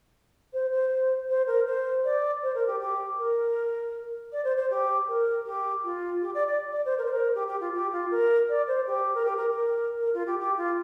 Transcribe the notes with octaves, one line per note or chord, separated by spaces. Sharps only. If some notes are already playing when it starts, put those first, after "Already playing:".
C5
C5
C5
A#4
C5
D5
C5
A#4
G4
G4
A#4
D5
C5
C5
G4
A#4
G4
F4
G4
D5
D5
D5
C5
A#4
C5
A#4
G4
G4
F4
G4
F4
A#4
D5
C5
G4
A#4
G4
A#4
A#4
A#4
F4
G4
G4
F4